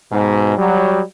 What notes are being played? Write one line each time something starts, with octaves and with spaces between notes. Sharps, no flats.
G#2 B2
F#3 G3